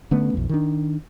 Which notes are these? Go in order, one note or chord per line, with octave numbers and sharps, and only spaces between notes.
D3 A3 B3 C#4
B1 F2
D#3 D4